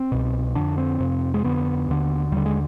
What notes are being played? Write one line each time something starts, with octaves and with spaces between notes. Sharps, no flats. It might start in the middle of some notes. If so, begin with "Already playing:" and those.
Already playing: C4
C2 B2
F2 D3 D4
C4
F2 C3
G#3
F2 D3 B3
D#2 D3
D#2 D3 G3
G#3